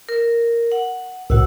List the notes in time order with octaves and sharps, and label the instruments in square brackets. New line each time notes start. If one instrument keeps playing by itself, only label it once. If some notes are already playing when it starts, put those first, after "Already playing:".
[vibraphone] A#4
F#5
[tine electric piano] C2 A2 [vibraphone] F#4 F#5 E6